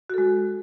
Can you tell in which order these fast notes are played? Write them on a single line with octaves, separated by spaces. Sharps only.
F#4 A4 G#3